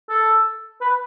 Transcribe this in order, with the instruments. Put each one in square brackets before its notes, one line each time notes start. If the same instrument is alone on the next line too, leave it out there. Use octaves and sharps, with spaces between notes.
[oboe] A4
B4